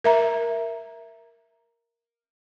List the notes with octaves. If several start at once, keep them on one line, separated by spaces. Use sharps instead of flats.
A#4 E5 A#5